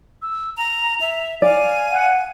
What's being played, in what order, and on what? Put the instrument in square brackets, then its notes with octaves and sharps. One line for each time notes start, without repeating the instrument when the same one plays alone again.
[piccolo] E6
[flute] A#5 [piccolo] F7
[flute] E5
[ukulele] D5 [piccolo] F5 [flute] G#5
[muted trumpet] F#5